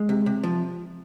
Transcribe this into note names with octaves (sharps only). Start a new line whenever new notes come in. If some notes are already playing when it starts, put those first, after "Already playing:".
Already playing: G#3
C3
C3
F3